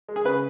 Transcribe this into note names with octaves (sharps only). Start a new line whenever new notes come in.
G#3
G#4
C#3 B4